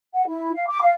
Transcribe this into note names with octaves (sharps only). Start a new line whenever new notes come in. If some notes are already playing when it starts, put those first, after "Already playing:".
F#5
E4
F5
D6
F5